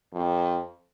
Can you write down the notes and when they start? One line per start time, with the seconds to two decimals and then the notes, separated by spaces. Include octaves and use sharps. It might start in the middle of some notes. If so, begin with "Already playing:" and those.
0.13 F2